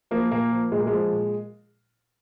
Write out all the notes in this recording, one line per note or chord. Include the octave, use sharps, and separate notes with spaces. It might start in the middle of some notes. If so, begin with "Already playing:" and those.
F3 A#3
A#2 A#3
F3
A#2 G#3
A#3
G#3
F3
A#2